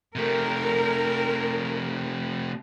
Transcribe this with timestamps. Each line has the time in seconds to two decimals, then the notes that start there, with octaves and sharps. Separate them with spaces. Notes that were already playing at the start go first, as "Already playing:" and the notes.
0.16 C3 A3 A#4